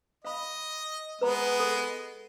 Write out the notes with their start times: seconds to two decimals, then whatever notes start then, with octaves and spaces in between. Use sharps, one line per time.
0.25 D#5 F5 B5
1.21 G#3 B3 B4 A#5 B5
1.60 A4